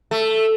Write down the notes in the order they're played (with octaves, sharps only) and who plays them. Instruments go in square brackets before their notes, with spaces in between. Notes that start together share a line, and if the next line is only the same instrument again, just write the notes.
[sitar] A3